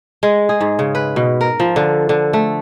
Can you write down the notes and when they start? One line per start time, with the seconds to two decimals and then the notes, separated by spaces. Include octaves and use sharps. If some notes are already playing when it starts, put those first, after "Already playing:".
0.23 G#3
0.49 G#4
0.61 G#2
0.79 C#3
0.95 B4
1.16 B2
1.41 A#4
1.60 F3
1.76 D3
2.09 D3
2.33 A3